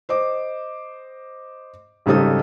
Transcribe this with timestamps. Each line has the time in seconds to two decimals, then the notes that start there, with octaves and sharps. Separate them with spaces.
0.09 C5 D#5 D6
2.06 G#1 C#3 G3 D#4 A4 D#6